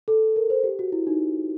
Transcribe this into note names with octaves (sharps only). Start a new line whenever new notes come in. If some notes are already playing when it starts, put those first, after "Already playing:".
A4
A#4
C5
G4
F#4
E4
D#4